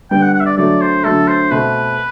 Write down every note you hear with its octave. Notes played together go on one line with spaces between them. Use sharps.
D3 G3 B3 G5
F#5
F#5
E5
D5
D3 F#3 A3 D5
C5
D3 F#3 A3 A4
C5
B2 A3 C4 B4